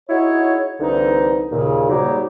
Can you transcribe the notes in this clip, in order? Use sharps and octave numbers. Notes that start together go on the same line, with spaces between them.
D#4 E4 F#4 G#4 C#5
C2 D3 E3 D#4
D#2 A#2 C#3
G#2 F#3 G3 A#3 D#4 G4